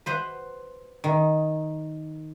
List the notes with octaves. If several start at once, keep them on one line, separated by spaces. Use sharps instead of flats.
B4 C5 F#5
D#3